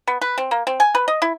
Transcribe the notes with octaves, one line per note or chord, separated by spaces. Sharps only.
B3
B4
C4
A#3
C4
G#5
B4
D#5
E4